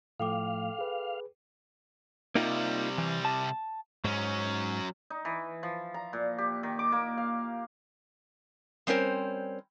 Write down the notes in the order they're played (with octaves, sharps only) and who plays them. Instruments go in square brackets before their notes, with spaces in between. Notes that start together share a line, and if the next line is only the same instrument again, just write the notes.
[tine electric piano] A2 F3 A3 [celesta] A4 G5 D6 [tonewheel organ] F5
[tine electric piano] G#4 B4
[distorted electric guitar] C3 G3 [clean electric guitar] A#3 D#4 F4
[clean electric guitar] E3
A5
[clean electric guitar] G#2 [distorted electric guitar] F#3 C#4
[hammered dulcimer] D#4
E3
F3
A#5
A#2
G4
D#3
D6
A#3
F5
[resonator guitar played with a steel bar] G3 C4 C#4 A#4 C5